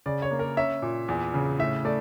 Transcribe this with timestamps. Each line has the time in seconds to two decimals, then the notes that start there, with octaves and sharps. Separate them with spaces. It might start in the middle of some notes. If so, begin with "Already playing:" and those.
0.06 C#3 D5
0.22 C#5
0.31 A#3
0.39 A#4
0.57 C#4 E5
0.82 A#2
1.08 E2
1.34 C#3
1.59 A2 E5
1.85 A3 D5